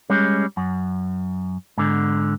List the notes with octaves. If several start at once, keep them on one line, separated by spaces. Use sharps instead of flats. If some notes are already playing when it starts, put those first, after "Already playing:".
G3 G#3 C#4
F#2
G#2 D3